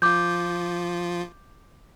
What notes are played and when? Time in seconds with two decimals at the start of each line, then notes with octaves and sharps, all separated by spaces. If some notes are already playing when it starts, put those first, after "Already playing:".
0.02 F3 F4 D6 G6